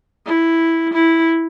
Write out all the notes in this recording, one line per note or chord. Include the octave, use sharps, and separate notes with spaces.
E4
E4